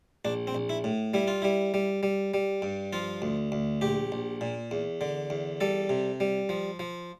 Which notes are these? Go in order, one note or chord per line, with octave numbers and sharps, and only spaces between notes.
A#1 D4
C4
A#1
E4
A2
G3 E4
F4
G3 E4
G3
G3
G3
G2
F3 F4
D2
D2
A#1 G4
A#1
A#2
E2
D3
E2
G3 A4
C3
G3
F3
F3